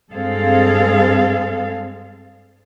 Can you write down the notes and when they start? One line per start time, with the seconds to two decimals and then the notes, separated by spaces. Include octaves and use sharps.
0.11 G2 G#3 C4 G#4 A4 F5